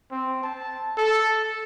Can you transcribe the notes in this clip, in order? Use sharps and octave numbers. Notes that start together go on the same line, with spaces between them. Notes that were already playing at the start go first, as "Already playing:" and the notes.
C4
A5
A4